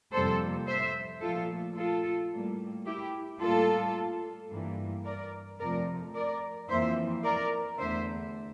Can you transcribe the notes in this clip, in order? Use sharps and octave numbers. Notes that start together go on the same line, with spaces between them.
F2 C3 G3 A#3 A4 C5
C5 E5
A#2 F3 A3 F4 A4
F4 A4
A2 G3 A#3
E4 G4
A2 G3 A#3 F4 A4
G2 E3 A#3
A#4 D5
F2 C3 F3 A3 A#4 D5
A#4 D5
F2 E3 A#3 C5 E5
A#4 D5
E2 D3 A3 C5 E5